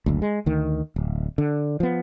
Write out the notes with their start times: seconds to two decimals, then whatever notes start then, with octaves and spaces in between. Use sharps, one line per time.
0.06 F#1 D2
0.22 G#3
0.46 D2 D#3
0.96 D1
1.38 D3
1.80 F3 B3